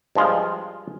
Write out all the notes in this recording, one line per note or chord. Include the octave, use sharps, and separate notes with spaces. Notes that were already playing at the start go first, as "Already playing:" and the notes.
G2 F3 G#3 F4